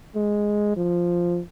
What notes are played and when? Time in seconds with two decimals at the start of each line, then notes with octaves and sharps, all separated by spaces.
0.16 G#3
0.77 F3